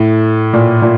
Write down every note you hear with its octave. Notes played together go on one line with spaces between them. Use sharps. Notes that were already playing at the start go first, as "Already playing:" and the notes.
Already playing: A2
A#2
A#2